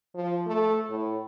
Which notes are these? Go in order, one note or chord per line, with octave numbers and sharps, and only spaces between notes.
F3
A3
A2